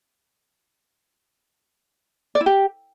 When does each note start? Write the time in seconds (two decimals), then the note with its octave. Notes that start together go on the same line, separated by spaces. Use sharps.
2.35 D5
2.41 E4
2.46 G4